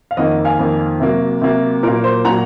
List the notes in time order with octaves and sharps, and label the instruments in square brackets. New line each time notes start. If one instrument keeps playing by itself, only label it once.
[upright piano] F5
F2 D#3 A#3 D#5 F#5
F5 G#5
F2 D#3 A#3
C3 F#3 A#3
C3 F#3 A#3
A#2 F#3 A#3 A#4
C5
A#2 F#3 A#3 F#5 A#5